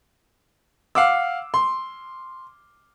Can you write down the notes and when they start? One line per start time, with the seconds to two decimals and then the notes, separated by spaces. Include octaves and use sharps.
0.95 F5 F#5 D6 E6
1.54 C6